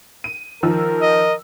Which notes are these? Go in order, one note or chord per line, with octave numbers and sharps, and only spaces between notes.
D#7
D#3 F3 A#4 E6
D#5